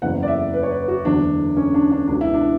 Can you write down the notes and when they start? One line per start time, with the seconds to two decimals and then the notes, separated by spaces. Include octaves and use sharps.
0.02 F#1 E2 C#3 E3 F#5
0.23 D5
0.28 E5
0.54 B4
0.63 C#5
0.71 B4
0.88 F#4
1.04 F#1 E2 D3 D4
1.57 C#4
1.74 D4
1.91 D4
2.07 C#2 D4
2.11 B2
2.21 E4
2.34 D4